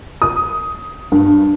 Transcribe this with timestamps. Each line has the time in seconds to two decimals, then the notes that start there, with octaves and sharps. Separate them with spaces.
0.22 D#6
1.12 G2